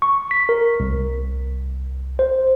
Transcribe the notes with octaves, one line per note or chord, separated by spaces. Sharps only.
C#6
B6
A#4
C2
C5